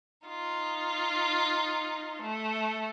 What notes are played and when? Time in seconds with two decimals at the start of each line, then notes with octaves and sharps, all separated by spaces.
0.28 D#4 F4
2.22 A3